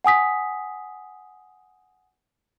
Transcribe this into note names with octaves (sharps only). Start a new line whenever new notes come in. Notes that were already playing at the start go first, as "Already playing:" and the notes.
F#5 G#5 D#6 B6